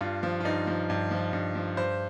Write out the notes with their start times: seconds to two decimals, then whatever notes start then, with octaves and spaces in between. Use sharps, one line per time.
0.01 G2 F4
0.23 F3
0.40 F4
0.45 G2 D#4
0.67 F3
0.90 G2
1.11 F3
1.33 G2
1.55 F3
1.77 G2 C5